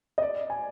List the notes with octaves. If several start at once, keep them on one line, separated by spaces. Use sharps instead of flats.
D#5
D5
G#5